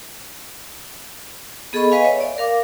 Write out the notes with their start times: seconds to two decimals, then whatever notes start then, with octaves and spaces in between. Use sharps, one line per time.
1.73 B3 G#4 A4 D#5 B5 C#6
1.91 B4 D#5 F5 G#5
2.04 C#5 E5
2.20 D5
2.38 A#4 F5 D6